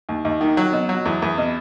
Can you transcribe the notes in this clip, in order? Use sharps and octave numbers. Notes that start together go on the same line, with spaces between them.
D#2
D#2
D#3
F#3
B2
F#3
E2
E2
B2